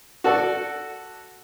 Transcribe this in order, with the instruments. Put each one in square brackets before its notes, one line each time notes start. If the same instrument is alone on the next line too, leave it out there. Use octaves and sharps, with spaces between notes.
[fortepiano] F#4 A4 D5